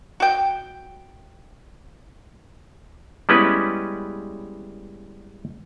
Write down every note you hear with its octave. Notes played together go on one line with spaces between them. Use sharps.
F#4 G5
G3 G#3 B3 C#4 E4 B4